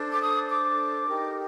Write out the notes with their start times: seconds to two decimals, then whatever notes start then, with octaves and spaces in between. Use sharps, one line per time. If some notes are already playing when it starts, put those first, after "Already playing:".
Already playing: D4 A4 C5
0.12 D6
0.21 D#6
0.50 D6
1.07 D#4 G4 A#4